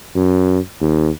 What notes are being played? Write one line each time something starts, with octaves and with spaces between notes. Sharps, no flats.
F#2
D#2